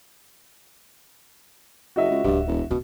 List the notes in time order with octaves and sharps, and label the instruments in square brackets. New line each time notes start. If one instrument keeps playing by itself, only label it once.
[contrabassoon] F#1 [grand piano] F#4 D#5 E5
[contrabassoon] C#2
[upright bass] D1 G#1 [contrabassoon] G2
[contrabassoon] E1
[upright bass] D1 D4 [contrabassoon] B2